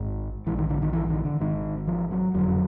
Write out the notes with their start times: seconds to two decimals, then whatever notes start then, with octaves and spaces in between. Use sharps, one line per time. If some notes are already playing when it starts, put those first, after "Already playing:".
Already playing: G#1 G#2
0.46 A#1 G#2 E3
0.58 D#3
0.70 D3
0.82 D#3
0.93 E3
1.09 D#3
1.25 D3
1.40 G#1 G#2 D#3
1.87 F3
2.11 F#3
2.34 F#1 F2 D3 F#3